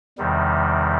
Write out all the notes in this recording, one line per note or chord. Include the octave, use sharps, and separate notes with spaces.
E2 C3 D#3 G3